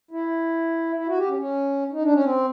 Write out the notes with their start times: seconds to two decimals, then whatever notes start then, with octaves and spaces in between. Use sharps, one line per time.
0.11 E4
0.96 E4
1.07 F#4
1.18 G4
1.28 C#4
1.39 C#4
1.92 D#4
2.03 D4
2.13 C#4
2.24 C4